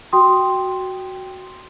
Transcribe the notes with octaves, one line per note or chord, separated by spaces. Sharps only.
F#4 G5 C6 D#6